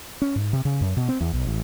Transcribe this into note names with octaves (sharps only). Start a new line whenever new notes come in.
C#4
G#2
C3
C#3
F#2
B2
C4
E2
B1
A1